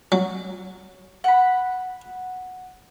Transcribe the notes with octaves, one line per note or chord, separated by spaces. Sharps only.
F#3
F#5 B5